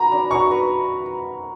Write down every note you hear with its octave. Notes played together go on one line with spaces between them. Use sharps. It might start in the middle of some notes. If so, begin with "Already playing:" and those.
Already playing: F#4 B4 A#5
D4
F#4 C#6
B4